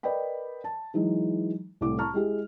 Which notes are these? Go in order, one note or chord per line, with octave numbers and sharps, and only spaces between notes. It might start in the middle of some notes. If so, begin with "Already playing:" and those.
A#4 B4 D5 D#5 G5 B5
A5
E3 F#3 G#3 D#4
C2 A2 A3 D6
A5 A#5 C#6 F6
G#3 E4 G4 G#4